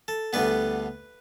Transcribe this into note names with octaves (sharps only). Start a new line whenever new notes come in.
A4
D2 D3 G3 B3 B4